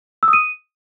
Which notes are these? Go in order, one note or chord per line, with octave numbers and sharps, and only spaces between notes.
E6
D#6
D#7